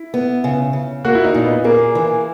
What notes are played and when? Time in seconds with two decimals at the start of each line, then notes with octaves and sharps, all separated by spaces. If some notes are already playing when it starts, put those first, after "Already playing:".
Already playing: E4
0.14 B3
0.44 C#3
0.73 C#3
1.05 A#3 F#4
1.15 E4
1.24 D#4
1.34 A#2
1.44 B3
1.64 A#3 G#4
1.95 E3